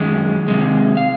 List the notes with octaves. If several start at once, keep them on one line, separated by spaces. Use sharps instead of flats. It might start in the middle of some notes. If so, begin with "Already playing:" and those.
Already playing: F#2 D#3 G#3
C3 D#3 G#3
F5